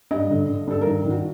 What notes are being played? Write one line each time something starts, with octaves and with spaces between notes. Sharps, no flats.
G2 D#5
D3
D3
G2 A4
D#3 A#4
D#3
F#4